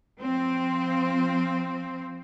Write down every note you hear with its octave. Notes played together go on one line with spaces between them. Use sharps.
F3 C4